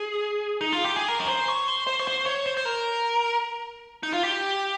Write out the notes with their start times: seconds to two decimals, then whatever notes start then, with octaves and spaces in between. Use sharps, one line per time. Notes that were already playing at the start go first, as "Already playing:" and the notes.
Already playing: G#4
0.61 D#4
0.73 F4
0.85 G4
0.96 G#4
1.08 A#4
1.19 C#5
1.28 C5
1.48 C#5
1.68 C5
1.87 C5
2.00 C#5
2.07 C5
2.26 C#5
2.46 C5
2.57 C5
2.65 A#4
4.03 D#4
4.13 F4
4.23 G4